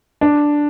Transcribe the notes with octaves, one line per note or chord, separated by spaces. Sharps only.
D4